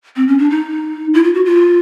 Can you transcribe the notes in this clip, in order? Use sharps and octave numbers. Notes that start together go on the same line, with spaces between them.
C4
C#4
D4
D#4
E4
F4
F#4
F4